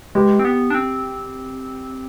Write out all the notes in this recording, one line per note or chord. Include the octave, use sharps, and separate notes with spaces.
G#3 G4 B4
C4
B3
D4
C4